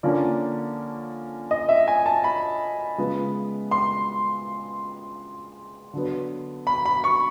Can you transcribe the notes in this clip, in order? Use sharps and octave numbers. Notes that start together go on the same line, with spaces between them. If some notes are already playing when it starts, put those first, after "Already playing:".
D3 F3 A#3 C#4 D5
D#5
E5
G#5
A5
B5
C#3 F3 G#3 B3
C6
D3 F#3 B3
B5
B5
C#6